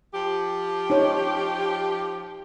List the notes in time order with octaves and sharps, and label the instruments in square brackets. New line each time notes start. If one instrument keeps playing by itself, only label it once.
[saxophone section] F3 G4
[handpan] D#4 C#5